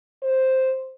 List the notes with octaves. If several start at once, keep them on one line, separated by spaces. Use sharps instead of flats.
C5